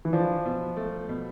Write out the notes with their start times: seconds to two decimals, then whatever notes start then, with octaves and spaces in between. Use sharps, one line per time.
0.05 E3
0.13 F3 D4
0.45 B2
0.77 A3
1.09 B2